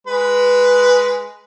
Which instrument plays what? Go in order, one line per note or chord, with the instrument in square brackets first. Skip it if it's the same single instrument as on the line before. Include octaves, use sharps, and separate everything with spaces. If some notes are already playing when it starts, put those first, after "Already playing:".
[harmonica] G#3 B4